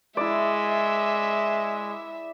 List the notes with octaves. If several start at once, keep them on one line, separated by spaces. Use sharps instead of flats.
G#3 E4 D5 E5